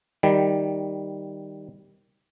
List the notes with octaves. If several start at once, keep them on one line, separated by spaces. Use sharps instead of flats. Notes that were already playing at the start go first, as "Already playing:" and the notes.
D#3 G3